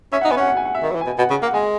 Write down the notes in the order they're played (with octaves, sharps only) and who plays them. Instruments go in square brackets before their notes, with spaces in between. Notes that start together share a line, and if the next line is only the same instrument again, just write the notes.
[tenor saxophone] C#4 [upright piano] E5
[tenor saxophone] D#4 [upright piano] F#5
[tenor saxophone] B3 [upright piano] G#5
[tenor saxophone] C#4 [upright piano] F#5
[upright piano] F#5
G#5
F#5
E5
[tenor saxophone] D#3
F#3
E3
[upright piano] G#5
[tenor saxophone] B2
[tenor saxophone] B2 [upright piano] F#5
[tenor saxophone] C#3
A#3
[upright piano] F#5
[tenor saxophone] G#3 [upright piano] G#5